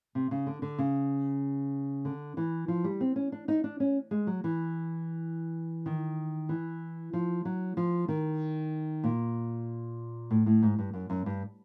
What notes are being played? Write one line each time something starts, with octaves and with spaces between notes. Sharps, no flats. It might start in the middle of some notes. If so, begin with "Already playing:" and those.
C3
C#3
D3
D3
C#3
D3
E3
F3
G3
C4
C#4
D4
D#4
D4
C#4
G#3
F#3
E3
D#3
E3
F3
F#3
F3
D#3
A#2
A2
A2
G#2
G2
F#2
F#2
G2